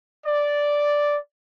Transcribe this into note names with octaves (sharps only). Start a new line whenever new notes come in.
D5